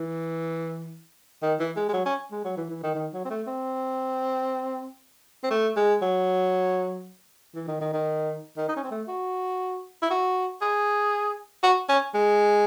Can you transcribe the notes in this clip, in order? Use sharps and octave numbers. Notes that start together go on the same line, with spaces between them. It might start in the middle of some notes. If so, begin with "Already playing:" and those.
Already playing: E3
D#3
E3
G#3
G#3
F#3
C#4
G#3
F#3
E3
E3
D#3
D#3
F#3
C4
A3
C4
C4
A3
G#3
F#3
E3
D#3
D#3
D#3
D#3
D#4
C#4
C4
A3
F#4
E4
F#4
G#4
F#4
C#4
G#3